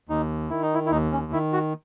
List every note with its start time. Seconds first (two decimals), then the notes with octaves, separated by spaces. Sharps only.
0.09 D#2 D#4
0.50 D#3 E4
0.62 D#4
0.74 E4
0.86 E4
0.91 D#2 D#4
1.12 C#4
1.32 D#3 E4
1.53 F#4